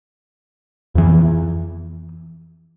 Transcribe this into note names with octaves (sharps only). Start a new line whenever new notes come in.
F2 E3